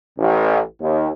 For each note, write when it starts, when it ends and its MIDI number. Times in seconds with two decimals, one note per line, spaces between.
0.18 0.59 33
0.80 1.09 39